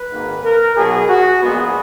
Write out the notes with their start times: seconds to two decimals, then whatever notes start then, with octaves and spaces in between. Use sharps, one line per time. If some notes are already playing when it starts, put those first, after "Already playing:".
Already playing: B4
0.09 G#1 G#2 D#3 A#3
0.43 A#4
0.76 B1 B2 F#3 G#4
1.09 F#4
1.42 A#1 A#2 G#3 B3 G#4